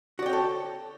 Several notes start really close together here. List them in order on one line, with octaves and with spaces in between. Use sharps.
F#4 D5 G5 C#5 A4